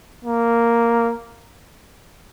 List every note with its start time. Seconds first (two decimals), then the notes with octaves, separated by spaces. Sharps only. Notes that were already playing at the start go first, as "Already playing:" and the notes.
0.25 A#3